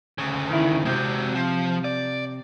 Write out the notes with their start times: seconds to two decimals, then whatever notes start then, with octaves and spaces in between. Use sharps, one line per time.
0.18 D2 C#3
0.51 D#3 E4
0.85 C3 G#3 C4 F#4
1.35 F3
1.84 D5